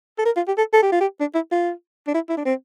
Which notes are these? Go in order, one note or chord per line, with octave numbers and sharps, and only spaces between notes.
A4
A#4
F4
G4
A4
A4
G4
F4
G4
D4
E4
F4
D4
E4
E4
D4
C4